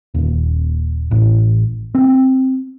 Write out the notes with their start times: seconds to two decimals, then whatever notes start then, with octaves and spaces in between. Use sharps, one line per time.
0.14 D#1
1.11 A1
1.95 C4